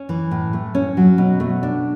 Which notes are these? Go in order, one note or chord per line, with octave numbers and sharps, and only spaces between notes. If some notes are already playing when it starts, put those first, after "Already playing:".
Already playing: C#4
E3
A2
A3
C#4
F#3
B2
A3
D4